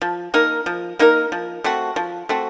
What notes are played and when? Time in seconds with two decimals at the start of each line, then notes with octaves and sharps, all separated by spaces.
0.02 F3
0.34 A#3 D#4 A#4
0.66 F3
0.99 A#3 D#4 A#4
1.32 F3
1.64 A3 C4 F#4
1.96 F3
2.29 A3 C4 F#4